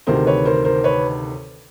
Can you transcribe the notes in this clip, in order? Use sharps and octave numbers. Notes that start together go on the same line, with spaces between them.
D2 C3 D#3 A#4 C5
B4 C#5
A#4 C5
A#4 C5
B4 C#5